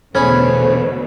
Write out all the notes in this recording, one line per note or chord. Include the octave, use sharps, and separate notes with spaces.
E2 B2 D3 A3 C#4 G#4 C5 B5